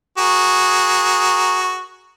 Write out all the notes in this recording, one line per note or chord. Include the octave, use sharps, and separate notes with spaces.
F#4 G#4 A#4